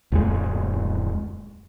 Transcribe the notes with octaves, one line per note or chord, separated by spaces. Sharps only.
D1 F2 G#3